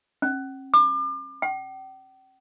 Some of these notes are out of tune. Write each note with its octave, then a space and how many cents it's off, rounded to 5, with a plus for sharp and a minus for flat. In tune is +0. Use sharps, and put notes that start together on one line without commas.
C#4 -45
D6 +35
G5 -45